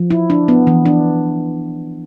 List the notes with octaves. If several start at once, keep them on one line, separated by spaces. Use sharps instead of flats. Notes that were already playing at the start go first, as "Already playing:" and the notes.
Already playing: F3
E4
D4
B3
E3
D4